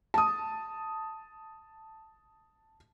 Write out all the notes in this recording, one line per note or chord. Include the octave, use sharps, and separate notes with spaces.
A5 D#6